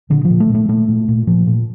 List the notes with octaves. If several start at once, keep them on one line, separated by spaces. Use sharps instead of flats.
A#2 D3
F3
A#2
A3
A#2
A3
A#2 A3
A#2
A#2
A#2 F3
A#2